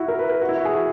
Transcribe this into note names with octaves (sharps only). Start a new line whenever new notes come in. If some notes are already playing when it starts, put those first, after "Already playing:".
Already playing: E4 F#4
A#4
B4
A#4
F#4
E4
F#4
G#4
F#4